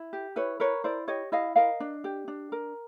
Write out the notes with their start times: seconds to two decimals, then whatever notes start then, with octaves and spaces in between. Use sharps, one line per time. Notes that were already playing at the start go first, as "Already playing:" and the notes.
Already playing: E4
0.13 G4
0.36 E4 B4 C#5
0.60 A#4 B4 C#5
0.84 E4 C5 D5
1.08 G4 C#5 D#5
1.32 E4 D#5 F5
1.56 A#4 D#5 F5
1.80 D4
2.04 G4
2.28 D4
2.52 A#4